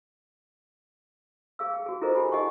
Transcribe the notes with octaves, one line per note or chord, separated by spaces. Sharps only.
G#4 F5 E6
G5
F#4 G#4
E4 F4 A4 A#4 C5 D#5
G4 G#5 B5
D#4 F#4 G#4 D#5 F#5 C#6